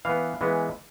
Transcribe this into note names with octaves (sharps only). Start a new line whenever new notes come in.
E3 B3 F5
E3 G#3 B3